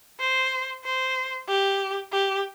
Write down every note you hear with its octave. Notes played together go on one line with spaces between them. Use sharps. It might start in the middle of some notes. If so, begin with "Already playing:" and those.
C5
C5
G4
G4